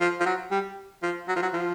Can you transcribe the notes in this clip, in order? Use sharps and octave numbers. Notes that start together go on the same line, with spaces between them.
F3
F3
F#3
G3
F3
F#3
F3
F#3
F3